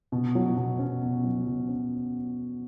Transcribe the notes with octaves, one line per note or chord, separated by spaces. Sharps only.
B2
F#3
B2
C#4
B2
F#3
B2
C#4